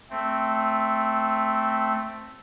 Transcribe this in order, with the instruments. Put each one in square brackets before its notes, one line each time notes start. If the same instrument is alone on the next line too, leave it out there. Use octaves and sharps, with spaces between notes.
[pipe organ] A3 C4